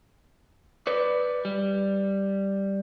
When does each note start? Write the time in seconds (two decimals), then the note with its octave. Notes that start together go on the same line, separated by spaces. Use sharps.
0.87 B4 D5
1.45 G3